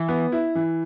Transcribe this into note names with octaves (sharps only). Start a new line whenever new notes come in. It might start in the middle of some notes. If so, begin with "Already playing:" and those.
Already playing: E3
B3
E4
E3